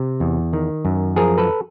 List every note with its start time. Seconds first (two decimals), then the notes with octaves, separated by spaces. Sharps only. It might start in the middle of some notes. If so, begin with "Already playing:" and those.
Already playing: C3
0.20 E2
0.53 D#3
0.85 F#2
1.16 F3 G#4 A#4
1.38 A4 B4